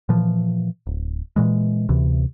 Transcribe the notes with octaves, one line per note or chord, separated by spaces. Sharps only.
A#2 E3 F3
D1
A#2 E3 G#3
D2 C3 E3